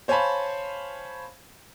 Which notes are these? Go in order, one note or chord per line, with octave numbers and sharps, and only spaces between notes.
C5 C#5 F5 G#5 A5 B5